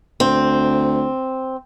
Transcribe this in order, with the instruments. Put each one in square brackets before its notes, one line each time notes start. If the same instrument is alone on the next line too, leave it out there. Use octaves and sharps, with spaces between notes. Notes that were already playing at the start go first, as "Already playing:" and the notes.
[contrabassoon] D2 [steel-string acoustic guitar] C4